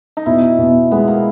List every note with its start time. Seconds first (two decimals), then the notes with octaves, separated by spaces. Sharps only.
0.17 D#4
0.26 B2 E4
0.59 B2
0.91 G#3 B3
1.08 A#3